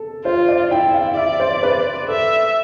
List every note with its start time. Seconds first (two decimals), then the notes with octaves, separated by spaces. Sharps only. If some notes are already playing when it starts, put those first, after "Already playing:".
Already playing: A4
0.25 F4 C5
0.49 D5
0.71 E4 G5
0.94 F5
1.17 D5 E5
1.40 C5
1.63 B4
2.08 A4 E5